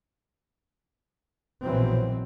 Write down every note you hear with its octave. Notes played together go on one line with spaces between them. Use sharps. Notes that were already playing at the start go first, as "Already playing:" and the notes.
A#1 B2 E3 F#3 C4